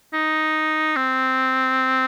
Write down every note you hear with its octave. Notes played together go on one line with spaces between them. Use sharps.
D#4
C4